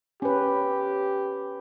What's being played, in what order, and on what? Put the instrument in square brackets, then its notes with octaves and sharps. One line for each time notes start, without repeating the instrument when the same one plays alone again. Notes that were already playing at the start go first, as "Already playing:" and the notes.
[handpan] C#4 B4 [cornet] G4